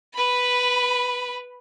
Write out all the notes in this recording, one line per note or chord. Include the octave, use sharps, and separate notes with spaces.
B4 B5